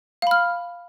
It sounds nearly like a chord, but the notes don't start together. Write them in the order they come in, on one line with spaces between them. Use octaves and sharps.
F5 B5 F6